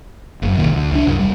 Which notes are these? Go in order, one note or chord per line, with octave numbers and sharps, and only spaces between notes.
F#1 F#2
E1 C2 A#2 D#3
D2
C2 F3 D4
C2 F#2
E1 B1 G3